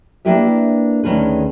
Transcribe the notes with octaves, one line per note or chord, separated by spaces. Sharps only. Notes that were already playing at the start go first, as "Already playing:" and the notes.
A#3 D4 E4 G4 B4 E5
D2 D#3 C#4 G#4 B4